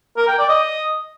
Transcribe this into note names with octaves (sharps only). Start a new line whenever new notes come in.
A#4
G5
D5
D#5